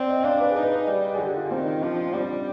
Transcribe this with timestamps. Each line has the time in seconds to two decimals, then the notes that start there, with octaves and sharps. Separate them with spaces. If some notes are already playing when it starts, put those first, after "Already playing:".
Already playing: C4 D5
0.09 D#5
0.24 D4 F5
0.40 B4
0.51 D#4 G#4
0.63 B4
0.87 G3
1.15 G#4
1.19 D3 G4
1.35 F4
1.51 D#3 C4
1.66 D#4
1.82 F3 D4
2.06 D4
2.13 G3 C4